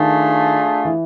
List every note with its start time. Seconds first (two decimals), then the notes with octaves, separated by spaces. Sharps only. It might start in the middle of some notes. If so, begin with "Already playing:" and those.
Already playing: D#3 A3 D4 F4 G#4
0.85 E3